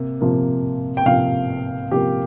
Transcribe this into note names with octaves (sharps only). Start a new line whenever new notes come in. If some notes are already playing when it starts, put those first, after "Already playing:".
Already playing: C3 A#3
C3 F3 A#3
G5
C3 F3 A#3 F5
C3 F3 A#3 G4